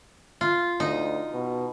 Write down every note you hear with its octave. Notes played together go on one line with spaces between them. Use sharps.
F4
D2 D#4
B2